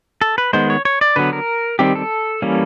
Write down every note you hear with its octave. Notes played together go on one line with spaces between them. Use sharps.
A4
B4
D#3 G#3 B3 C5
C#5
C#5
D5
D3 F#3 B3 B4
A#4
D#3 G3 C4 G4
A4
E3 G3 A#3 C#4